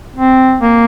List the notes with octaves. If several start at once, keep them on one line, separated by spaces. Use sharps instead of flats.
C4
A#3